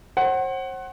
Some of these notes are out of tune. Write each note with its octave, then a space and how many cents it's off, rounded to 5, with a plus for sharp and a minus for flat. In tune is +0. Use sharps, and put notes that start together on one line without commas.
C5 +40 F#5 +20